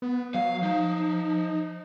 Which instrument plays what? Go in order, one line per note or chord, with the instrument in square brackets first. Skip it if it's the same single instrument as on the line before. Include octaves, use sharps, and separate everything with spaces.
[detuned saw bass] B3
[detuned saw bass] F#3 [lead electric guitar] F5
[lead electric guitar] F3 [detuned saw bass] D#4